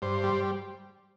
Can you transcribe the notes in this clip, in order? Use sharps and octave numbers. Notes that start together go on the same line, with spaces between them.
G2 C5
G3